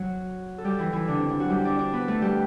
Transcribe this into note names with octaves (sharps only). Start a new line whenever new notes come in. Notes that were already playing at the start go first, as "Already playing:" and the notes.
Already playing: F#3 F#4
A4
G3 G4
E3 E4
E3 E4
D3 D4
C4
D3 D4
F#3 F#4
G3 G4
D4 D5
D4 D5
B3 B4
A3 A4
G3 G4